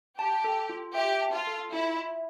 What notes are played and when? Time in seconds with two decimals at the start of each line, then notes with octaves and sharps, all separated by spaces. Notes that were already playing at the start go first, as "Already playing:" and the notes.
0.18 G4 A5
0.44 A4
0.69 F4
0.95 G4 E5
1.21 A5
1.33 F4
1.47 A4
1.72 E4 F4
1.97 E5